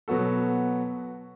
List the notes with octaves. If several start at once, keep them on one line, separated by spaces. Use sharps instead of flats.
B2 F#3 B3 F#4 A4